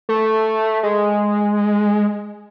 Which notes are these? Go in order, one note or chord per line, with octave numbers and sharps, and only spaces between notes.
A3
G#3